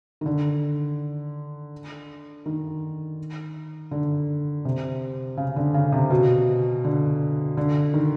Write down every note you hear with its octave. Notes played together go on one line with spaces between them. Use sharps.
D#3
D3
D#3
D3
C3
C#3
D3
C#3
C3
B2
D3
D3
D#3